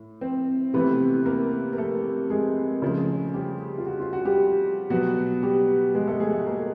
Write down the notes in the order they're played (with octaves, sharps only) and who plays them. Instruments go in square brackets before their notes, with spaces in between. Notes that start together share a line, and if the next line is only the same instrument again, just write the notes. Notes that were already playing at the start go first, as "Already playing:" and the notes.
Already playing: [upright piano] A2
C4 C5
C3 E3 A3 B3 B4
A#3 A#4
A#4
A3 A4
G#3 G#4
C#3 F3 A3
G3 G4
F4
F#4
F4
F#4
G3 G4
B2 F#3 B3 F#4
G3 G4
G#3 G#4
A3 A4
G#3 G#4
A3 A4
A#3 A#4